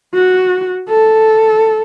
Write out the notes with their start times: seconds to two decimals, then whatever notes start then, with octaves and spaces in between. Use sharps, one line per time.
0.14 F#4
0.89 A4